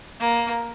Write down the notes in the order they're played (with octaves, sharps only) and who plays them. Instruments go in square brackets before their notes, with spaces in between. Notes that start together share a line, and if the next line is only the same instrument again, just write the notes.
[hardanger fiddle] A#3